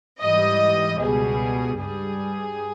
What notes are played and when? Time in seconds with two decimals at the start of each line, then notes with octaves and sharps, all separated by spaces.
0.21 G#2 E3 G3 D#5
1.00 C#2 B2 G3 G#4
1.80 G2 G3 G#4